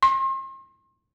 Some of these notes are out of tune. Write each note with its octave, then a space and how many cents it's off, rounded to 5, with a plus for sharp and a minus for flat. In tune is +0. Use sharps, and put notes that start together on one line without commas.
C6 +40